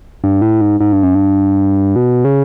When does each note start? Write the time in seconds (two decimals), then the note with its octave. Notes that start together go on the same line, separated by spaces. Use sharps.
0.24 G2
0.42 A2
0.61 G#2
0.80 G#2
0.93 G2
1.03 F#2
1.15 G2
1.96 B2
2.25 C#3